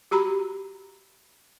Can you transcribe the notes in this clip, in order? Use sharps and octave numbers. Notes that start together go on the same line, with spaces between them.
F#4 G4 A#5 B5